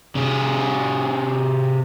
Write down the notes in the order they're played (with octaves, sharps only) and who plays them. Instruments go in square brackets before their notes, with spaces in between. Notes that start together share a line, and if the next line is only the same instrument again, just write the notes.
[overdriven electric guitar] C3 G#4